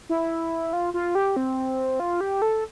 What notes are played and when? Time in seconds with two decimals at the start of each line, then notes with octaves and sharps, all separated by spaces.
0.09 E4
0.73 F4
0.94 F4
1.15 G4
1.36 C4
2.00 F4
2.21 G4
2.42 A4